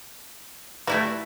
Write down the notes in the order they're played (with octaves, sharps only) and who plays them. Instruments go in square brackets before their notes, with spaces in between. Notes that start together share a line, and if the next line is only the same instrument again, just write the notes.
[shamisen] E3 G3 [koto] A3 E4 F#4